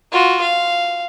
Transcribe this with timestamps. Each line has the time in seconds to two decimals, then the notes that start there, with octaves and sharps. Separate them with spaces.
0.12 F4 F#4
0.41 F5